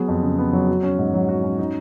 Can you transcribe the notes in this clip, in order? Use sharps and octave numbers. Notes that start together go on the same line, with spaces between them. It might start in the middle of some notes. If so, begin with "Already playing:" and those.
Already playing: F#3 B3 G#4
F2
C#3
B3
F#3
F#4
C#4
G#2
F#3
F#4
C#4
D#4